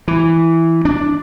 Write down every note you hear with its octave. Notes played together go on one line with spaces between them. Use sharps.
E3
D4